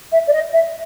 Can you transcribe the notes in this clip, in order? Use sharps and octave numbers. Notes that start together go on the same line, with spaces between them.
E5
D5
D#5
E5